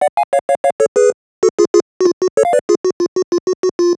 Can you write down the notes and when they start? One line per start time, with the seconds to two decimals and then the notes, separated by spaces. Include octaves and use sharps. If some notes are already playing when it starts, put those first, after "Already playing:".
0.01 D5 F#5
0.17 F5 G#5
0.33 C#5 F5
0.49 C#5 F5
0.64 C#5 F5
0.80 A4 C#5
0.96 G#4 B4
1.43 F#4 A4
1.59 F4 G#4
1.74 F4 G#4
2.01 F#4
2.06 F4
2.22 F#4
2.37 A4 C#5
2.45 F5
2.53 B4 D5
2.69 F4 G#4
2.85 F#4
3.00 F4
3.16 F#4
3.32 F4
3.47 F#4
3.63 F#4
3.79 F4